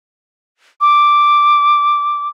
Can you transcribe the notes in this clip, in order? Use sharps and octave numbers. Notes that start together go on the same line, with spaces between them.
D6